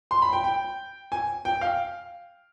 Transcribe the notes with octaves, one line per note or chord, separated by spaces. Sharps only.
C6
B5
G5
G5
G#5
G5
F5